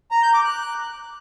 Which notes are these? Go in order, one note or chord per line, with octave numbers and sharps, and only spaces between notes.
A#5
G6
D6
F#6